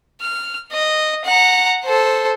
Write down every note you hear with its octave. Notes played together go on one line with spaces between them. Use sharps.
F6
D#5
F#5 A#5
A4 C5